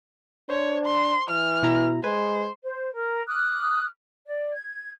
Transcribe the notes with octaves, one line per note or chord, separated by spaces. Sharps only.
D4 C5 C#5
C6
E3 F6
B2 E4 A#5
G#3 B4 C5 G#5
C5
A#4
D6 D#6 F6 F#6
D5
G#6